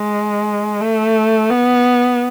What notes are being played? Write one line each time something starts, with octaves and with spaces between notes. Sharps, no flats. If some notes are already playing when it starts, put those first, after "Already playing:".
Already playing: G#3
A3
B3